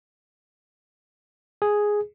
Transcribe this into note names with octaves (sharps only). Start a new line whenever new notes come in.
G#4